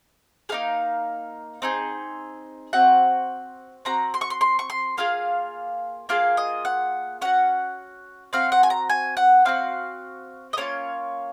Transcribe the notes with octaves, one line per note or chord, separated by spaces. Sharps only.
A#3 D#4 G#4 F5
C4 D#4 G#4
C4 F#4 F#5
C4 F#4 A#5
C6
C#6
C6
C6
C#6
C6
A#3 F4 G#4 F5
A#3 F4 G#4 F5
D#5
F#5
C#4 F#4 F#5
C4 F#4 F5
F#5
G#5
A#5
G#5
F#5
C4 D#4 F#4 F5
D#5
A#3 C#4 F4 C#5